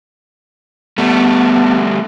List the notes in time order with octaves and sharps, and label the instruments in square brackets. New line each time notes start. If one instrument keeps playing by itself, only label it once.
[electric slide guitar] G3 A3 [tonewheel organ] B3 F#5 A5